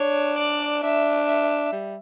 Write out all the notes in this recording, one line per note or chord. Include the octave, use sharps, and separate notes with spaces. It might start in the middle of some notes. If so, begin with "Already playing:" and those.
Already playing: D4 C#5
D5
D4 E5
E5
G3